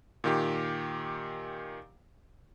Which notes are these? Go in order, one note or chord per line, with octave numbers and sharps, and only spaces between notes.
A#2 D#3 G4